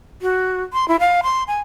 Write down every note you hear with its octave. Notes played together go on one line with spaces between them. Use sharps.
F#4
C6
E4
F5
C6
G#5